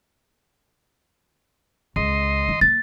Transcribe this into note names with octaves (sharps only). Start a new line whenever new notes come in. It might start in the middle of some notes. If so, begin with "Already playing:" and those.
C#2 D#5 C6
E3
A#3 A6